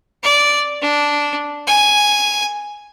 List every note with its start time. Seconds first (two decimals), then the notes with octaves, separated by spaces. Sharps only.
0.24 D5
0.82 D4
1.67 G#5